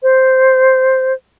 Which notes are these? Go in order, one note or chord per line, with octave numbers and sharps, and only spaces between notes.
C5